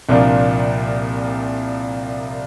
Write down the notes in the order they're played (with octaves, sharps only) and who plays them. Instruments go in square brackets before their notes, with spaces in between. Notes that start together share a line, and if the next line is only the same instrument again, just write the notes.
[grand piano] C2 A#2 F3 A#3 D4